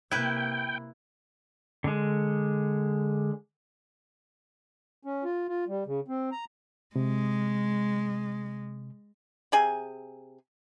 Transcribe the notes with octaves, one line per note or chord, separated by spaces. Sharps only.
C3 A#3 E4 B4 G5
D3 G#3
C#4
F4
F4
G3
C#3
C4
A#5
C3 G#3
C3 G#4 G#5